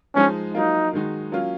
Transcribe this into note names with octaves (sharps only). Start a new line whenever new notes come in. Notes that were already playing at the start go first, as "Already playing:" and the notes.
F3 G#3 C#4 D#4
F#3 A#3 D#4 F4
D#3 G#3 D#4 F#4
F#3 A#3 C#4 F4